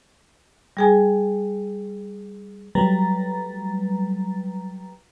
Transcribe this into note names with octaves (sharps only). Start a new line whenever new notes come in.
G3 G#4 G#5
F#3 G3 A3 B4 A#5 A6